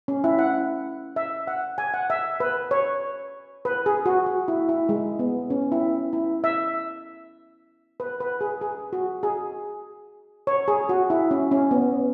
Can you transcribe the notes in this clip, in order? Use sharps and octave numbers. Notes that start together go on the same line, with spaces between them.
C#4
E4
F#5
E5
F#5
G#5
F#5
E5
B4
C#5
B4
G#4
F#4
F#4
E4
E4
G#3
B3
C#4
E4
E4
E5
B4
B4
G#4
G#4
F#4
G#4
C#5
G#4
F#4
E4
C#4
C#4
B3